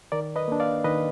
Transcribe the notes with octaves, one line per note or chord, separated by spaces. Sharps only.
D#3 A#4 D5
B4 D#5
A#3 D4
D5 F5
D#3 B4 D#5